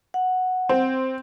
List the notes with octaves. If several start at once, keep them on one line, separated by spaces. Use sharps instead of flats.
F#5
C4